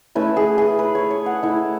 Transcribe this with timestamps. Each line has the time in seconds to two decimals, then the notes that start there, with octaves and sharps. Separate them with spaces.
0.15 A3 C#4 E4 B4
0.37 G#4
0.58 G#4
0.79 B4
0.95 C#5
1.11 C#5
1.26 F#5
1.43 A3 E4